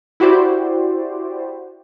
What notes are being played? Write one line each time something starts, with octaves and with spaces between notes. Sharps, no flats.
E4 F#4 G4 C5 D5